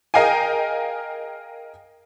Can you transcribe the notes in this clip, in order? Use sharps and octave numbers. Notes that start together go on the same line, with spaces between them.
G#4 A#4 D#5 F5 G5 G#5